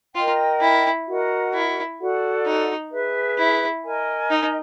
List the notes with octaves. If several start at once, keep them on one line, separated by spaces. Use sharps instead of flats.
F4 A#4 D#5 G5
E4
F#4 A#4 D#5 F#5
E4
F#4 A4 D5 F#5
D#4
G#4 B4 E5
E4
A#4 D#5 G#5
D#4